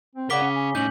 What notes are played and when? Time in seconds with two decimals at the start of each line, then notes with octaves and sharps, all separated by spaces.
0.15 C4
0.30 C#3 A#4 D5 F#5 D6 B6 G7
0.42 C#4
0.55 G#5
0.75 A2 C#4 D#4 G6 F#7